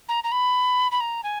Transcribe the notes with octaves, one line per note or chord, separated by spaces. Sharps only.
A#5
A#5
B5
B5
A#5
G#5